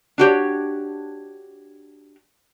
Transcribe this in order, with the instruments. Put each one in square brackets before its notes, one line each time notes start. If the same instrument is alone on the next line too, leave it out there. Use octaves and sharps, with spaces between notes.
[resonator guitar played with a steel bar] D4 F#4 G4 C#5